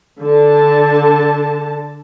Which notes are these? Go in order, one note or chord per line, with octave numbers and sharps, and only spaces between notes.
D3 A5